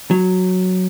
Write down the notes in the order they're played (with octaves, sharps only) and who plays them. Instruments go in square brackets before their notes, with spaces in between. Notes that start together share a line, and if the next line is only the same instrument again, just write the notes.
[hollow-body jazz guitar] F#3